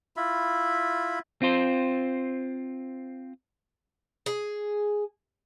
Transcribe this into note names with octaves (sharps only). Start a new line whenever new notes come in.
E4 F4 E5 B5
C4 F4 C5
G#4